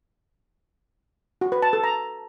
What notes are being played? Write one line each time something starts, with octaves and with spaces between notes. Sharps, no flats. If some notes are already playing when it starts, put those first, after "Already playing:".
F#4
B4
A5
A4
A#5